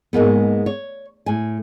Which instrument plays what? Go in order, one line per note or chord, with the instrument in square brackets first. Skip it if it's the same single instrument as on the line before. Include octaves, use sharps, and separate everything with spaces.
[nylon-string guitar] G#2 G#3 A#3 B3
C#5
A2 G#5